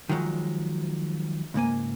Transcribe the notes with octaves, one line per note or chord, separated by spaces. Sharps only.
D#3 F3 F#3 G#3
C#2 G#2 A#3 G#5